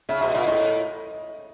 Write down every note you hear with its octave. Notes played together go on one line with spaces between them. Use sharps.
C#3 E5
B2 E5
A#2 D#5
A2 D#5